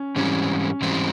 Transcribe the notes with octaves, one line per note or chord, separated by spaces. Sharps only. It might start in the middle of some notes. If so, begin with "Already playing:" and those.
Already playing: C#4
G#2 E3 G3 C4 C#4
G#2 E3 G3 C4